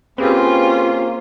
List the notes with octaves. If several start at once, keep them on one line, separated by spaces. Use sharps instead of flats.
A#3 C4 C#4 F4 G4 G#4 B4